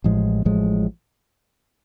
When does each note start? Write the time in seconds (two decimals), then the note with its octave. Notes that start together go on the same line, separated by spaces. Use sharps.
0.04 A1 A2 F3 G#3
0.45 A1 A2 F3 G#3